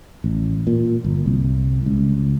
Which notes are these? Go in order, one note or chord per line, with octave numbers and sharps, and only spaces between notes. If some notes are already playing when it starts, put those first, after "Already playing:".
A1
A#2
G1
C2
C#2